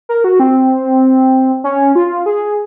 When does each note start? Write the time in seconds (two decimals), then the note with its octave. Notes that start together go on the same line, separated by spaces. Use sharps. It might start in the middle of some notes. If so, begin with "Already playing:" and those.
0.09 A#4
0.24 F#4
0.40 C4
1.64 C#4
1.95 F4
2.26 G#4